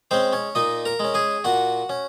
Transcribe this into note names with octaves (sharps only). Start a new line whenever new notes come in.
G#3 C4 C#4 C5
C#4 C#5
A#2 D#4 D#5
A#4 A#5
G#3 C#4
G#4 G#5
A#2 F#4 F#5
C#4